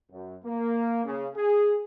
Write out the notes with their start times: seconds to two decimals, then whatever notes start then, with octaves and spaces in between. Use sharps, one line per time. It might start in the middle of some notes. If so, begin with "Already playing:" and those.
0.11 F#2
0.45 A#3
1.05 C#3
1.35 G#4